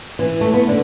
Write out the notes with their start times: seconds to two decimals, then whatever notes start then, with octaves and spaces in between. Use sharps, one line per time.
0.19 E3
0.41 A3
0.54 B3
0.68 D3